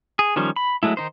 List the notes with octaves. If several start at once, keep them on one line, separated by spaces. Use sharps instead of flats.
G#4
D#3 F3 G3 C#4
B5
F#3 G#3 A3 E4
D#3 D#4 C5